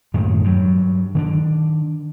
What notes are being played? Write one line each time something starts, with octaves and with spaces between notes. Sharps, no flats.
F#2 A2 D#3 G#3
G2 F#3
D#3 C4 D4